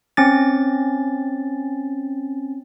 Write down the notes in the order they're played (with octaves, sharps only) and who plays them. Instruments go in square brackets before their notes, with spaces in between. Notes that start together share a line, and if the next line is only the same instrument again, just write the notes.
[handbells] C4 C#4 A6